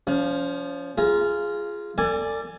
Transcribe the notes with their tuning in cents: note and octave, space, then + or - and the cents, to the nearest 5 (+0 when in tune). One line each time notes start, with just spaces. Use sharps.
F3 +0 C#4 +30
F4 -10 G#4 +0 A#5 +25
A4 +40 D5 +0 G#5 +0